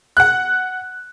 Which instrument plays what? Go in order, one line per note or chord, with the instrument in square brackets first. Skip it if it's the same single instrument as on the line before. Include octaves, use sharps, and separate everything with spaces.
[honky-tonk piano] F#5 F#6